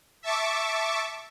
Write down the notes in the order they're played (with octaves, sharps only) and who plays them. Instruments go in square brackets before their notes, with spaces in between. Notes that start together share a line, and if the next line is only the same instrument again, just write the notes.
[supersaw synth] E5 A5 C#6 D6